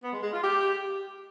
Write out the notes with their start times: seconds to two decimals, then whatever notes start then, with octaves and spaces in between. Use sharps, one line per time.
0.03 B3
0.13 G#3
0.23 G#3
0.33 F4
0.43 G4